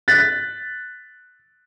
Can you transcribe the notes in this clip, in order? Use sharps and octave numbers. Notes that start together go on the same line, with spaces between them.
F#6 A6 B6